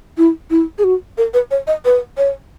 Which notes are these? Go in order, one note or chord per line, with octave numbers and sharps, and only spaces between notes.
E4
E4
G#4
F#4
A#4
B4
C#5
D#5
B4
C#5